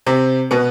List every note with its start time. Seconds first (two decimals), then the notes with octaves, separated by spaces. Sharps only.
0.06 C3 C4
0.51 B2 B3